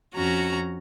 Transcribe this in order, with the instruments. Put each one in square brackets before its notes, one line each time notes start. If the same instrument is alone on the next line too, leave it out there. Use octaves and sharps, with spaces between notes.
[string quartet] F2 C#4 F#4 A#5